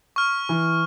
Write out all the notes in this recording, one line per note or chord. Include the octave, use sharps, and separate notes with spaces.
C#6 F6
E3